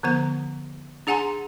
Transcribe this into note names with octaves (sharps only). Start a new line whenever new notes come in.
D3 F3 B3 A#5
D4 G#4 F#5 G#5 A#5 C6